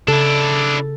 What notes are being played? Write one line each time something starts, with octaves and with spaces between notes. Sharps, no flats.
C#3 D4 E4 A4